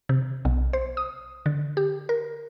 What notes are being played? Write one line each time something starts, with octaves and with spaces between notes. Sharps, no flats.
C3
B1
C5
D#6
D3
G4
A#4